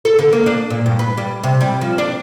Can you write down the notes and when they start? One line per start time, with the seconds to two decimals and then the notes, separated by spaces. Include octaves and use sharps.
0.05 A4
0.19 D3
0.33 A#3
0.46 D4
0.70 A#2
0.86 G2
0.99 B4
1.17 G3
1.43 C3
1.61 G3
1.81 F3
1.98 D4